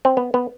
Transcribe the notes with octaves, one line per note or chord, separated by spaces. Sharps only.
C4
B3
B3